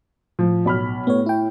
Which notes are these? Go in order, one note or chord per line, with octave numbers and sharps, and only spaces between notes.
A2 F3
B1 B5 F6
A2 B3 C#5
E4 G5